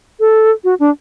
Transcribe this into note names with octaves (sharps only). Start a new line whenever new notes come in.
A4
F#4
D4